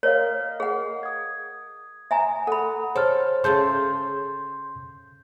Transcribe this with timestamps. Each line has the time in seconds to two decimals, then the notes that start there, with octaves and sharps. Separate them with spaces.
0.03 A#4 C#5 D#5 F5
0.60 G#4 F#5
1.03 D#6 G#6
2.11 E5 G#5 A#5
2.47 A4 F#5 B5
2.96 A4 C5 C#5 F6
3.44 C#3 A3 A4 C6 G6